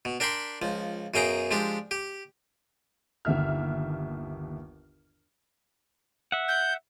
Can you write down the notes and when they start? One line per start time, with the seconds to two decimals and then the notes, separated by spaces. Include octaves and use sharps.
0.05 B2
0.20 D4 A#4 G5 B5 C6
0.62 C#2 F3
1.14 F#2 B2 G#4 F5 G5 A#5
1.51 F3 G#3 D4 G4
1.91 G4
3.25 G1 D#2 E5 F6
6.32 E5 F#5
6.48 G6